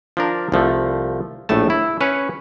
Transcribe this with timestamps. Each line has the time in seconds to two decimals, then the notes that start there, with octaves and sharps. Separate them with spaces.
0.17 F3 D4 A#4
0.52 C2 F3 A3
1.49 A#1 A2 A3 A5
1.70 E4
2.01 C#4 B4 C#5